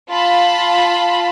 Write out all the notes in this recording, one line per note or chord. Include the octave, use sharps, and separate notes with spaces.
F4 A5 B5